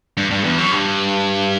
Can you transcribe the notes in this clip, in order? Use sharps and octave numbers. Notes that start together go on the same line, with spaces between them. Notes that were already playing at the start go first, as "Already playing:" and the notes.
G2
G2
E2
F#2
G2